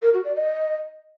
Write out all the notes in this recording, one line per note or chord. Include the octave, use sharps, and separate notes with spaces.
A#4
F#4
D5
D#5